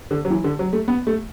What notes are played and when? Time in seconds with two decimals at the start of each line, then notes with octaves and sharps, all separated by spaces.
0.11 D3
0.25 F#3
0.30 E3
0.44 D3
0.59 F#3
0.73 A3
0.88 B3
1.07 A3